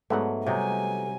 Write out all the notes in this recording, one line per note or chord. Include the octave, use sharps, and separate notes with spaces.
G#2 F#3 A3 B3 F#5
C3 F#3 G3 D#4 G#5